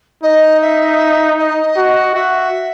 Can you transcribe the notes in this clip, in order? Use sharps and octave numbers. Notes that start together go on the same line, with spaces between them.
D#4 D#5
E5
D#5
F#4
F#4 E5